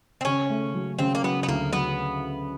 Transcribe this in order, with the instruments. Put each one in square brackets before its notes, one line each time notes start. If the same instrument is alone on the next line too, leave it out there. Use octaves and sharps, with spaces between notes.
[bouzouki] C4
[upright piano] C#3 [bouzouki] C#4
[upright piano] A3
F#3
[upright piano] C#3 [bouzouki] C4
[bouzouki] A#3
[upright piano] F#3 [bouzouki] B3
[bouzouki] B3
[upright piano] D2 [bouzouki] A#3
[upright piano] F#3 [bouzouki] B3